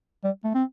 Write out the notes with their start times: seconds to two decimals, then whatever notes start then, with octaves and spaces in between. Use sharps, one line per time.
0.24 G3
0.44 A3
0.54 C4